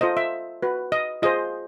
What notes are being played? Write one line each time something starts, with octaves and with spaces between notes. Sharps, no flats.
F4 A4 C5 D#5
E5
F#4 B4
D#5
F4 G#4 C5 D#5